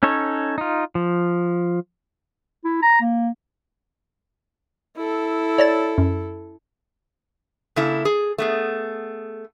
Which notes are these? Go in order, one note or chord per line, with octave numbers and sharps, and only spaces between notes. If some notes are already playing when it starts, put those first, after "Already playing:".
C#4 D#4 A4 C#5
D#4 F4
F3
E4
A#5
A#3
E4 A4
C#5 D5 A6
F#2
C#3 A#3 E4 A4
G#4
A3 B3 G#4